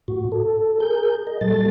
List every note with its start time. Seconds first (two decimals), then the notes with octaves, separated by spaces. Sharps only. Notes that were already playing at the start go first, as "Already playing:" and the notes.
0.08 A2 F#4
0.32 A4
0.80 G#4 A#4 G6
1.27 D#5
1.41 A#2 F#3 G3 A4 A6